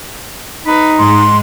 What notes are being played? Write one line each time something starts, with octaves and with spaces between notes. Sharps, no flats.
D#4 B4
G#2 G#3 C6